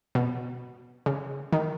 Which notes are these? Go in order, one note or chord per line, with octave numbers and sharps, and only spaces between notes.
B2
C#3
D#3